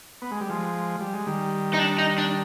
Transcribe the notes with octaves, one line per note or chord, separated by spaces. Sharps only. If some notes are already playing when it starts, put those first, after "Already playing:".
B3
G#3
G3
F3 G#3
G3
G#3
D#3 G3
D#4
D4
D#4
D4